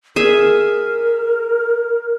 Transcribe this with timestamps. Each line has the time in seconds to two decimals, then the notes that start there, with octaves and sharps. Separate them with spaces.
0.16 G#4 A#4 E5